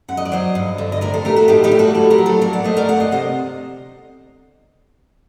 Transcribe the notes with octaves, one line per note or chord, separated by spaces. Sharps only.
F#2 F#5
D#5
D5
F#3 C5 D#5
G2
D3
D#5
A2 A#4 D5
A4 C5
A3 G4 A#4
F#4 A4
A2 D#4 G4
D#4 G4
G3
F#4 A4
A2 F#4 A4
G4 A#4
F#3
A4 C5
A#2 A#4 D5
D5 F#5
A3 C5 D#5
A#4 D5
D2 D5 F#5
C5 D#5
C3 C5 D#5